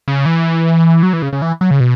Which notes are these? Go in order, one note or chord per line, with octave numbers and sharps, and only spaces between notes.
C#3
E3
F#3
E3
C#3
C#3
E3
F#3
C#3
B2